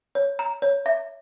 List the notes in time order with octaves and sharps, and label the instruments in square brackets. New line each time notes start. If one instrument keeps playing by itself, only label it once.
[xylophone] C#5
A#5
C#5
E5